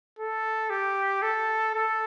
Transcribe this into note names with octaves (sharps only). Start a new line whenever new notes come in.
A4
G4
A4
A4